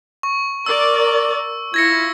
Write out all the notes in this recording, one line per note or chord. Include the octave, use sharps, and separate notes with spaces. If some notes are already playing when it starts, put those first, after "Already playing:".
C#6
A#4 D5 E6
E4 F4 G#6 A#6 C#7